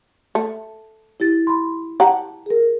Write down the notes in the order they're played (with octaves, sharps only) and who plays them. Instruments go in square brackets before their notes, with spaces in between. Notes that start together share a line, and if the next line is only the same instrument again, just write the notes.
[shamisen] A3
[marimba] E4 G4 A6
B5 C6
[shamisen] G4 F#5 [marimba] A5 A#5
[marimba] G#4 A#4